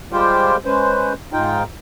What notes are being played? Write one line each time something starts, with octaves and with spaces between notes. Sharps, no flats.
G3 G#3 F4 G4 C5 G5
G#3 C#4 B4 C5
G#2 D#4 F4 G5